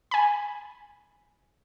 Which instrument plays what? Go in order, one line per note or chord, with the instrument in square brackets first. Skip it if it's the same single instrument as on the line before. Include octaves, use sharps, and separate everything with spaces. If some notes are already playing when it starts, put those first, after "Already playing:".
[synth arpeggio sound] G#5 B5